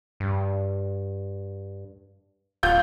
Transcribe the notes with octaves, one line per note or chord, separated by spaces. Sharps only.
G2
D1 F4 G6